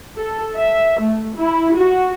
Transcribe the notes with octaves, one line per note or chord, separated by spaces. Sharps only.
A4
E5
A3
E4
F#4